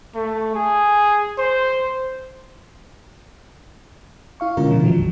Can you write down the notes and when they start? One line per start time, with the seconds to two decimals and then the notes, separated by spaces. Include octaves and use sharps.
0.15 A3
0.55 G#4
1.38 C5
4.40 E4 F5 C#6
4.57 B2 D3 G#3 C#4 F4 A#4
4.71 A#2 D#3 F3
4.84 D#3 F3 F#3 G#3
4.98 A#1 F2